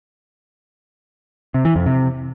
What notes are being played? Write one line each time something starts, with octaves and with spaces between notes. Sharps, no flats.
C3
E3
F2
C3